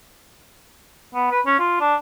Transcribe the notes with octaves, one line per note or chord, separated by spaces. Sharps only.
B3
B4
C#4
F4
D4